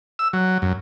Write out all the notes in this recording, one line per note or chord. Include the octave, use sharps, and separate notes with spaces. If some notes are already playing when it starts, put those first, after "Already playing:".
E6
F#3
F#2